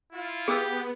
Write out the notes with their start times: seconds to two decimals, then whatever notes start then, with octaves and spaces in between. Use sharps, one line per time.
0.13 E4 F4
0.48 B3 G4 G#4 D#6 E6